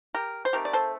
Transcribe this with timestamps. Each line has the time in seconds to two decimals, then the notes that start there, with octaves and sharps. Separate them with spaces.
0.14 G4 A#4
0.45 C5
0.53 D#3 A3 C4 G4 A#4
0.65 D5
0.73 A4 C5